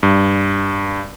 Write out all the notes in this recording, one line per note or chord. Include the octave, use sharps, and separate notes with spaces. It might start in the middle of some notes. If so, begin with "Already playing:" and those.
G2